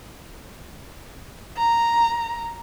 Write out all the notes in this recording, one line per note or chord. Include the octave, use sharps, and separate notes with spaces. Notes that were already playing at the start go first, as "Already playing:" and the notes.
A#5